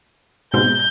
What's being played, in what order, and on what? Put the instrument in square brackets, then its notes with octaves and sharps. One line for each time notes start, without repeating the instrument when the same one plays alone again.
[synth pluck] G#2 B2 C4 [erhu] G6